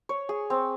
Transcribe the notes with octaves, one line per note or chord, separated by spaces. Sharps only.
C#5
G#4
C4